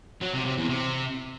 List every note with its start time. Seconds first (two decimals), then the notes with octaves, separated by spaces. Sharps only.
0.22 F#3
0.34 C3
0.45 C3
0.57 E2
0.69 C3